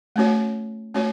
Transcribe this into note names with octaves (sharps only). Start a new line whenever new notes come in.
A3 C#4 F#4 C#5
A3 C#4 F#4 C#5